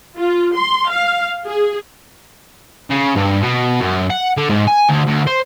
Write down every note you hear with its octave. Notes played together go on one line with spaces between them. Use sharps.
F4
C6
F5
G#4
C#3
G2
B2
F#2
F#5
D3
G#2
G#5
D2
D2
C5